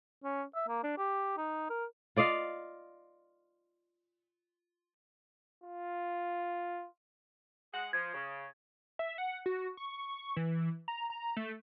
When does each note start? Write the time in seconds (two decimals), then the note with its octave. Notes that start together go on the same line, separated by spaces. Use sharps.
0.24 C#4
0.55 E5
0.68 A#3
0.84 D4
0.98 G4
1.38 D#4
1.70 A#4
2.16 F4 D5 D#5 F5
5.64 F4
7.73 G#3 G#4 F#5
7.93 F3 G#6
8.14 C#3
8.99 E5
9.18 F#5
9.46 F#4
9.77 C#6
10.36 E3
10.88 A#5
11.10 A#5
11.37 A3